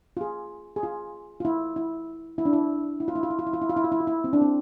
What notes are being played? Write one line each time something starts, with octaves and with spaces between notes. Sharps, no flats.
F4
G#4
G#4
F4
F4
E4
E4
E4
D4
E4
E4
F4
E4
F4
E4
F4
E4
F4
E4
F4
E4
F4
E4
F4
E4
C4
D4
C4